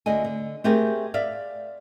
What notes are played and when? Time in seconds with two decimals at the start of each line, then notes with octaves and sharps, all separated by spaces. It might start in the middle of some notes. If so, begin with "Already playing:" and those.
0.06 D2 D3 D#5 G#5
0.25 D3
0.64 A3 C4 G4 G#4 A#4
1.14 D5 E5 F5